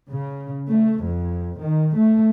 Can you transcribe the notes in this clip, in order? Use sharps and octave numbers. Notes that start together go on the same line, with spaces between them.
C#3
A3
F2
D#3
A3